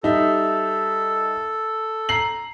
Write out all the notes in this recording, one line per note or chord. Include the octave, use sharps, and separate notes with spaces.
G3 D#4 A4 E5
A#5 C7 F#7